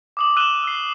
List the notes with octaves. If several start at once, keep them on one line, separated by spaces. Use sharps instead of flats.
D6 D#6 F#7
E6 F#6 D#7 E7 F#7 G7
E6 C7